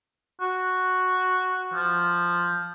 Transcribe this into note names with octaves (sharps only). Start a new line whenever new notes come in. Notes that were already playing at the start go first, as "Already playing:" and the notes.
F#4
F3